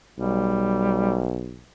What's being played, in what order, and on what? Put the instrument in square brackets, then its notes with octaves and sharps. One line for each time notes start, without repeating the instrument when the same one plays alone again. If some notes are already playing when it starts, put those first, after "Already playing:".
[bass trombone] B1 [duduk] G3